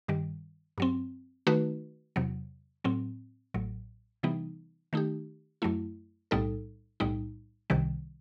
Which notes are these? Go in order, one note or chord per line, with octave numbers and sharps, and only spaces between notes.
G2 D#3 G3
G2 F#3 C4
D#3 A3 D#4 F#4 B4
E2 C3 F#3
A2 F#3 C4
A1 A2 F#3
C3 E3 G3 B3 D#4
D#3 A3 D#4 G4
F#2 F#3 A3 E4
B1 A2 G3 D#4 A4
B1 A2 G3 D#4
C2 C3 D#3 G3